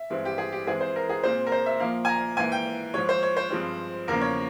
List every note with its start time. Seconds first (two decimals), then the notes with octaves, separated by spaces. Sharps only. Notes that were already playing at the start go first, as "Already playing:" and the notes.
Already playing: E5
0.10 G2 E3 G#3 C4
0.25 G4
0.38 G#4
0.53 G4
0.67 G#2 E3 G#3 C4 G#4
0.81 C5
0.96 A#4
1.09 G#4
1.23 A#2 G#3 C4 C5
1.46 A#4
1.52 C5
1.66 E5
1.80 A#2 F3 A#3 F5
2.05 G#5
2.09 A#5
2.37 G#2 E3 A#3 G#5
2.52 G5
2.94 G#2 F3 G#3 C#5
3.09 C5
3.23 C#5
3.37 C5
3.50 G2 F3 G#3 C4
4.08 E2 C#3 F3 A#3 A#4
4.21 C#5